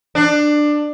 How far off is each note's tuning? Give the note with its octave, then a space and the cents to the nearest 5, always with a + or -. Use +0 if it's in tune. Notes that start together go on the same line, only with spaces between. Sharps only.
D4 +15